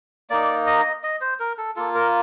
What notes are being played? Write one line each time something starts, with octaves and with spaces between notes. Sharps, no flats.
A#3 D#4 D5
D#5
D#5
C5
A#4
A4
A#3 F4 A4
A#4